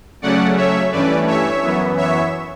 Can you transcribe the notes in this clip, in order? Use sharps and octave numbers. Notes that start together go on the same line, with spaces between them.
C#3 F#3 A3 C#4 D5 F#5
C#5 E5
G2 E3 A3 C#4 B4 D5
C#5 E5
F#2 E3 B3
C#5 E5